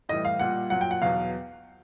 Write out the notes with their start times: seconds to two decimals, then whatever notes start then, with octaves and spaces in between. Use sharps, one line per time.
0.09 A2 E3 G3 D#5
0.25 F5
0.40 A#2 G3 F#5
0.70 A#2 F#3 F#5
0.81 G5
0.91 F#5
1.02 E2 B2 F#3 F5